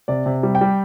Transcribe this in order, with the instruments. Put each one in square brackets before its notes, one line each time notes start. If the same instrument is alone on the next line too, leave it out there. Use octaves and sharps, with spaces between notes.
[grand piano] C3 D5
C3
G3
G5
G3